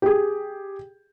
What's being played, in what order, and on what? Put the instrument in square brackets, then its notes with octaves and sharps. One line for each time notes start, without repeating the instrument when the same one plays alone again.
[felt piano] G4 G#4